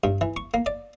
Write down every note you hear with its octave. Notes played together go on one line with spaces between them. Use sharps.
G2
E3
C#6
A#3
D5